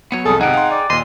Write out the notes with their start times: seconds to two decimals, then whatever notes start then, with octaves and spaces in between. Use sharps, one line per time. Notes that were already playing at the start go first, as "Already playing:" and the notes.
0.12 F#3 B3 C#5 C#7
0.25 C2 F2 G#4 A4
0.41 G#1 C3 D#4 G#4 F#5 G5
0.54 F5 C6
0.71 D5
0.90 D#2 A#2 D#5 C6